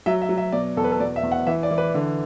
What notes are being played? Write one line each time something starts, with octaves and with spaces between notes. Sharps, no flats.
F#3 E5
E5
F#3
E5
B2 D5
E2 A4
B4
A4
B2 D5
E5
E2
F#5
E3 E5
D5
E3
B4
D3